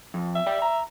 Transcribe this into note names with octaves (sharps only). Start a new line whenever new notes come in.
F2
E5
D5 G5
A#5